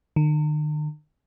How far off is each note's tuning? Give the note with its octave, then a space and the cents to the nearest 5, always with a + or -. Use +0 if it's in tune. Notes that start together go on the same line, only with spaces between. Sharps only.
D#3 -45